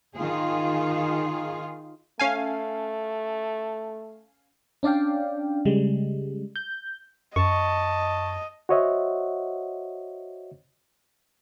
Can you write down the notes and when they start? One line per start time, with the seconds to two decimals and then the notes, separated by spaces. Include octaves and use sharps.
0.15 D#3 F4 G#4
2.19 A3 C#4 F5 G#5
4.83 C#4 D4 D5 F5 G5
5.65 C#3 G3 G#3
6.56 G6
7.36 F#2 D#5 A5 C#6
8.69 F#4 C5 C#5 D#5 E5 F#5